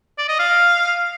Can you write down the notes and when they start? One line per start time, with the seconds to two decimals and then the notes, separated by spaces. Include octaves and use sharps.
0.18 D5
0.29 D#5
0.39 F5